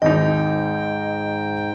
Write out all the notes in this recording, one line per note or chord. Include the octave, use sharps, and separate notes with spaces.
G#1 D#2 G#2 D#4 D#5 G5